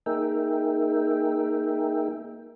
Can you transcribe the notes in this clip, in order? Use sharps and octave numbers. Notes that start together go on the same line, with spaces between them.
A#3 D#4 G#4 A#4 E5 G5